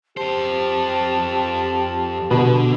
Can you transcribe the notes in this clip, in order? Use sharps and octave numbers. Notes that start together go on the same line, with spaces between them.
F2 G4 C5 A5
B2 D3